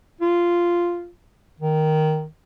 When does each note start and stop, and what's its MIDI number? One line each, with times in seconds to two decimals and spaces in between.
0.21 1.09 65
1.60 2.26 51